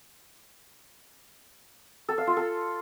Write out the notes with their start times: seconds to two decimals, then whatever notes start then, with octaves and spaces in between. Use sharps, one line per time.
2.09 A4
2.18 F5
2.27 F4
2.37 A4